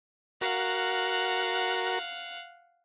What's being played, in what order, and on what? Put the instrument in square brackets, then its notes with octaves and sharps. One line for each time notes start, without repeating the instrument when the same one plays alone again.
[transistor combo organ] F#4 A#4 [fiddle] F5 F#5